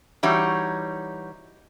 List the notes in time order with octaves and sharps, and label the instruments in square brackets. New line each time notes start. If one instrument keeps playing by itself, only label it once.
[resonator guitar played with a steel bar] E3 G3 D#4 F#4 C#5